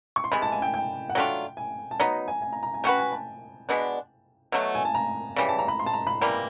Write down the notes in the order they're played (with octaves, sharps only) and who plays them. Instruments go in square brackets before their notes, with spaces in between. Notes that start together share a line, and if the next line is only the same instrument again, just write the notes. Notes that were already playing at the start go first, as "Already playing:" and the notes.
[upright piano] C#6
C6
[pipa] C3 E3 G#3 [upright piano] B5
[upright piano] A5
G#5
G5
G5
F#5
[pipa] F#3 A3 D4 F4 [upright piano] G5
[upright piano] G#5
A5
[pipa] F#3 B3 D#4 [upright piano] A#5
[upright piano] G#5
G#5
A#5
A#5
G#5
[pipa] A3 C#4 F#4 B4 [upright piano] G5
[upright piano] G#5
A5
[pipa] B2 G#3 B3 D4
B2 F#3 A3
[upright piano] G#5
A5
A#5
[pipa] C#3 E3 G3
[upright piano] A5
A#5
B5
C6
A5
A#5
B5
[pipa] E3 G3 A#3